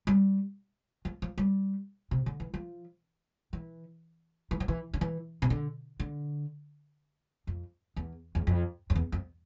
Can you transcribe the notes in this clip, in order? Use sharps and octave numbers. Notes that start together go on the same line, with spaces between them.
G3
F3
F3
G3
C3
D3
E3
F3
E3
E3
F3
E3
D3
E3
C3
D3
D3
F2
E2
E2
F2
F2
E2
F2